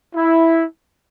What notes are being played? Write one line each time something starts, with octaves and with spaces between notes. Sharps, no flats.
E4